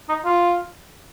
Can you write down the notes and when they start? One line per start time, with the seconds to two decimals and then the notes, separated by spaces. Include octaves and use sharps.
0.09 D#4
0.25 F4